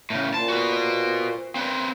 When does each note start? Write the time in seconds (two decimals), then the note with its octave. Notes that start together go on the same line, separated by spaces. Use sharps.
0.10 A2 C#3
0.34 A#2 C5 A5
0.49 F#4 B4
1.56 C4 B4